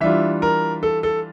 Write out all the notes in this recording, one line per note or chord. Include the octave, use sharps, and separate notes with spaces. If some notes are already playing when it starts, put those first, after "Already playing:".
E3 G3 D4 F4 E5
A#4
A4
A4